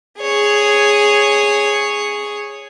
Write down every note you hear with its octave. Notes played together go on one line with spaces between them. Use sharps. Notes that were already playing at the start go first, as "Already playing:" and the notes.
G#4 C#5